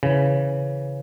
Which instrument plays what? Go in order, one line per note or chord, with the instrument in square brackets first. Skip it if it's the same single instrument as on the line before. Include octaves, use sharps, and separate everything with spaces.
[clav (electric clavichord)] C#3 E3